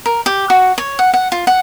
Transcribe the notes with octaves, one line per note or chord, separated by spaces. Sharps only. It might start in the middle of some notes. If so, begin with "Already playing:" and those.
A#4
G4
F#4
C#5
F#5
F#5
F4
F#5